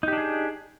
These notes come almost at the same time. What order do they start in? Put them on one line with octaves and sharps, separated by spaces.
D#4 G4 D4 G#4